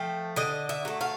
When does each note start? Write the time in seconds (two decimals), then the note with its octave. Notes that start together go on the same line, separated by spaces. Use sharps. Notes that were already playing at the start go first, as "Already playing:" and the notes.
Already playing: F3 A3 G5
0.36 D3 D#5
0.69 E5
0.85 F#3 A3
1.01 F5